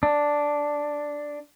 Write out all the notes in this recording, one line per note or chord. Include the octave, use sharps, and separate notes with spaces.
D4